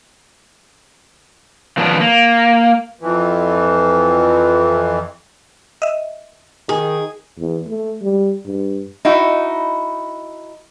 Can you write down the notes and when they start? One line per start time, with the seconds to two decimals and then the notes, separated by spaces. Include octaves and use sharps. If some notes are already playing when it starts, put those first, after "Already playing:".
1.78 D#3 F3 B3 C#4 D4
2.00 A#3
3.01 F2 E3
5.82 D#5 E5
6.69 D#3 G#4
7.40 E2
7.69 A3
8.01 G3
8.46 G2
9.05 D#4 E4 F#4